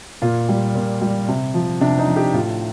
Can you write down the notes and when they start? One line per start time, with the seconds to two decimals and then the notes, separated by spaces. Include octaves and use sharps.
0.22 A#2 F4
0.49 G3
0.75 A#2
1.01 G3
1.28 C3
1.54 F3
1.81 C3 D4
1.98 D#4
2.07 F3
2.16 G4
2.33 A2 F4